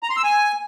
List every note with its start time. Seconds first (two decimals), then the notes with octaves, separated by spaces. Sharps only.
0.03 A#5
0.10 C6
0.17 E6
0.24 G#5